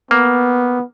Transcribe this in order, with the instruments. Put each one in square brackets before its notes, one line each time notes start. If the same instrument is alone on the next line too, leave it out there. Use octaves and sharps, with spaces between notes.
[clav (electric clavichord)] A#3 [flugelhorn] B3